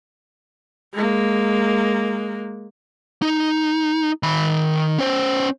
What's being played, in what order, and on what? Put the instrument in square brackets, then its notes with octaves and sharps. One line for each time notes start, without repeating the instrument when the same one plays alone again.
[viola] G#3 A#3
[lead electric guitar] D#4
D#3 B5
C#4 C5